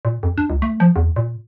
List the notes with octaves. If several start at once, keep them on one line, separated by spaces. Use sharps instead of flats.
A#2
F2
D4
C#2
A3
F3
E2
A#2